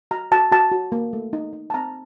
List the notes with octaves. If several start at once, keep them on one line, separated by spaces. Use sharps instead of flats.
F#4 A#5
F#4 A5
F#4 A5
F#4
A#3
A3
D#4
D#4
A5
C4 A#5